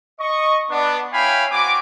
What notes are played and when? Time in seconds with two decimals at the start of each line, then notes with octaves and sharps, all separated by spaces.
0.19 D#5 C#6
0.69 B3 D4
1.13 E4 C#5 F5 G5 G#5 B5
1.51 C4 F#4 G#5 D6